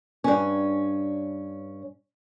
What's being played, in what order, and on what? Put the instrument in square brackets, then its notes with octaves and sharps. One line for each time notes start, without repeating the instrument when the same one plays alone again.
[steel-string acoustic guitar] G2 C#4